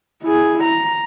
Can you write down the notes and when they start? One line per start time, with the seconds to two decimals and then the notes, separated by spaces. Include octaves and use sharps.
0.23 E4 G#4
0.64 A#5